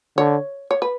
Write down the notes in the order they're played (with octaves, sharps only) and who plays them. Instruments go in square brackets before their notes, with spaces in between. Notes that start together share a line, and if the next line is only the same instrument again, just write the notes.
[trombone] D3 [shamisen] C#5
[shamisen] C#5
B4